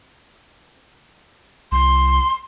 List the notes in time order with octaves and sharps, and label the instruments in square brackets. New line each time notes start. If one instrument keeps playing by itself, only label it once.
[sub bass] C2 [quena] C6